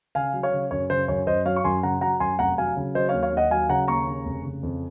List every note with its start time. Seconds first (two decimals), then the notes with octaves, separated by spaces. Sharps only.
0.15 C#3 F5 G#5
0.33 F#3
0.43 C#5 F5
0.53 C#3
0.71 F#2 C#5
0.90 C#3 C5
1.08 F#2 C#5
1.27 F#2 C5 D#5
1.46 F#3 C#5 F5
1.56 C#6
1.64 F#2 G#5 C6
1.83 C#3 F#5 A#5
2.01 F#3 F#5 A#5
2.20 F#2 G#5 C6
2.39 F1 F#5 A#5
2.58 F#3 F5 G#5
2.77 C#3
2.95 F#3 C5 D#5
3.09 D#2 C#5 F5
3.23 C#5 F5
3.33 D#2 D#5 F#5
3.51 F#3 F5 G#5
3.69 C#3 F#5 A#5
3.88 D#2 A#5 C#6
4.07 C#3
4.25 F1
4.44 C#3
4.63 F2